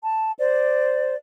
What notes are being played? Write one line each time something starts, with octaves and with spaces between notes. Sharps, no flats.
A5
C5 D5